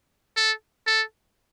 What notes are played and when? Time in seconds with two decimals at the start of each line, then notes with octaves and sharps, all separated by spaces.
0.37 A4
0.87 A4